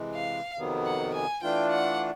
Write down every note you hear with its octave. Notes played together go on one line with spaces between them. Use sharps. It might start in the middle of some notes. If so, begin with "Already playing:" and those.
Already playing: C3 E3 G#3
F5
F2 C3 D#3 F#3 B3
F#5
G#5
E3 A3 D4 F4 G5
F#5